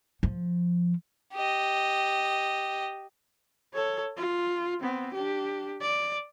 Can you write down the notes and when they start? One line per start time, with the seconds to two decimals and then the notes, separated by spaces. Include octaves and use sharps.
0.23 F3
1.34 G4 D#5
3.74 A4 C#5
4.17 F4
4.81 B3 C4
5.14 D4 G4
5.81 D5